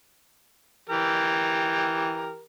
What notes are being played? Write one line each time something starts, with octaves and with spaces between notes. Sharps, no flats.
E3 G4 A#4